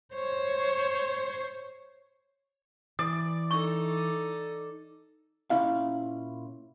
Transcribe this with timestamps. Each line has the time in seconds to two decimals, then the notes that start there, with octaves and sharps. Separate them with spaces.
0.15 C5 C#5
2.99 E3 D5 D#6
3.51 D#4 A4 C#6
5.50 A#2 C#4 E4 F5